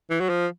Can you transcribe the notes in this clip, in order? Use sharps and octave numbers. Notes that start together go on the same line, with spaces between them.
E3
F#3
F3